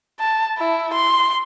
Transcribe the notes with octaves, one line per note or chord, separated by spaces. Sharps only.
A5
E4
C6